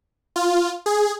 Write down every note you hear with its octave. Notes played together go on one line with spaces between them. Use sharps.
F4
G#4